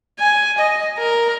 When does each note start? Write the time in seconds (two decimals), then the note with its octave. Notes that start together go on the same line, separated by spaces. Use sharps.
0.19 G#5
0.58 D#5
0.98 A#4